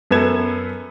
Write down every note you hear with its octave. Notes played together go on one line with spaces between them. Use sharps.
F#2 B3 A4 B4 G#6 E7